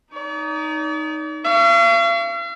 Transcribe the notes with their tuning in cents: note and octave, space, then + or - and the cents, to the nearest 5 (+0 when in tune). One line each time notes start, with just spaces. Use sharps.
D#4 +0 D5 -45
F5 -45 C#6 +30